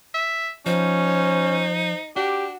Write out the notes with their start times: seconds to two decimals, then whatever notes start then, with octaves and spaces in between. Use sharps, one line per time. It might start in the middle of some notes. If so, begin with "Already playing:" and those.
0.14 E5
0.66 F3 C#4 D#4 C5
2.16 D4 F#4 G4